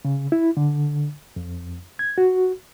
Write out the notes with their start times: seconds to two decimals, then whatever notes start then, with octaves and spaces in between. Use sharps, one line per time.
0.05 C#3
0.32 E4
0.57 D3
1.36 F2
1.99 G#6
2.18 F#4